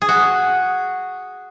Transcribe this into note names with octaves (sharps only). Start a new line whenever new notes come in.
G#4
F#4